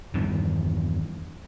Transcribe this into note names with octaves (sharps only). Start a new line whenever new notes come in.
E2 G2 D#3 E3